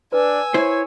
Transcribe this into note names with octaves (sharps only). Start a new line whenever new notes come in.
D4 B4 G#5 E6
E4 C5 C#5